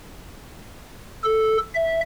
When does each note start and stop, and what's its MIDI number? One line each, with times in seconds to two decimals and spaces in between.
1.24 1.57 69
1.75 2.01 76